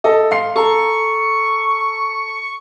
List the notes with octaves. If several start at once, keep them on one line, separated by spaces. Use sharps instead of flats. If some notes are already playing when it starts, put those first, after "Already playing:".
A4 D#5
F5 C6 C7
A4 A#5 C#6